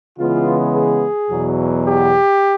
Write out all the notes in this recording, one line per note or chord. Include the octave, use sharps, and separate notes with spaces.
C#3 E3 G#3 B3 F4
G#4
E2 B2 F#3
G4